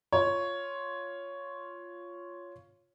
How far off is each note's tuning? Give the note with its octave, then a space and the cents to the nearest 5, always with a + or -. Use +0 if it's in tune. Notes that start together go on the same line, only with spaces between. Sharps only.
F4 +0 C#5 +5